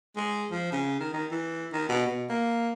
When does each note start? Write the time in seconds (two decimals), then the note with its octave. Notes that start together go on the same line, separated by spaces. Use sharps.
0.16 G#3
0.51 F3
0.72 C#3
1.00 D#3
1.13 D#3
1.31 E3
1.73 D#3
1.89 B2
2.06 B2
2.29 A#3